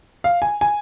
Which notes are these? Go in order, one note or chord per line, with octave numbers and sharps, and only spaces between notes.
F5
G#5
G#5